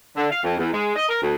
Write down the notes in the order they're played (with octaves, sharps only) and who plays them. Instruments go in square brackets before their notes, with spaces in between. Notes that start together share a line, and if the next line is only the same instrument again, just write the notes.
[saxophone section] D3
F5
F2
E2
G#3
D#5
A#4
D2